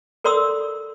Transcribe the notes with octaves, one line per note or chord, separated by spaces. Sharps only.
A4 A#4 D5 C6 D#6 E6